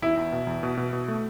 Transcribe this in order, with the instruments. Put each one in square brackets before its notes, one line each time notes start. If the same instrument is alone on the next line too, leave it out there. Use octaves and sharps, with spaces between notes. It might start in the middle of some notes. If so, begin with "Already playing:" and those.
[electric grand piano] E2 [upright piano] E4
[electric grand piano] E2
B2
E2
B2
B2
B2
A3